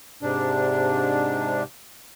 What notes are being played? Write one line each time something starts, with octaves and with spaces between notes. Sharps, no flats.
G#2 C3 D4